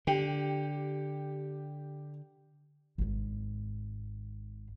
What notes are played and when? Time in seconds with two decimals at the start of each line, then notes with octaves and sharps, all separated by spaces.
0.07 D3 G4
2.98 G#1 G#2